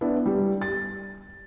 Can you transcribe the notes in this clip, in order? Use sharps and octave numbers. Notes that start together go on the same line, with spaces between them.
B3 D4 E4
G3
A6